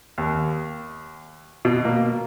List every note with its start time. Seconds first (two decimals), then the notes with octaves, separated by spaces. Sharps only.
0.18 D#2
1.65 B2
1.85 A#3